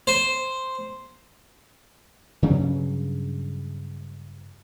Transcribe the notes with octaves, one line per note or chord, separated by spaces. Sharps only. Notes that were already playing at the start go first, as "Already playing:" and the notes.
C5
G2 C#3 F#3 G3